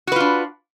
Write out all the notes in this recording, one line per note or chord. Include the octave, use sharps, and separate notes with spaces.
D4 F4 F#4 B4